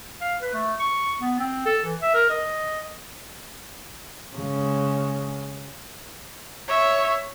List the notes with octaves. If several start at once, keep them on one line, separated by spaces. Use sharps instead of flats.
F5
B4
A3
C#6
B3
C4
A4
E3
E5
A#4
D#5
C#3 G#3
C#5 E5